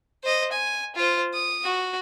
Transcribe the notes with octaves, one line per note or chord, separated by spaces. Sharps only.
C5 D#5
G#5
F4 C5
D#6
F#4